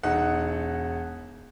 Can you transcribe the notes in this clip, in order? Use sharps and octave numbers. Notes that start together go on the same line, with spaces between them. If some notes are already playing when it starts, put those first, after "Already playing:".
E1 D#4 F#5